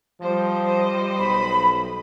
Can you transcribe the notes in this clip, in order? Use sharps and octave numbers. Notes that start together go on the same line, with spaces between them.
F3 G3 C5 D#5
B1 B5